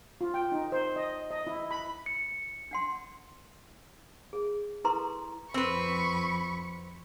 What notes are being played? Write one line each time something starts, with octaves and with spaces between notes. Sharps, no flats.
F4
G5
D#4
C5
D#5
D#5
E4
B5
C#7
D4 F#5 C6
G#4
E4 A4 B4 A#5 C6 C#6
F2 C4 B4 B5 C#6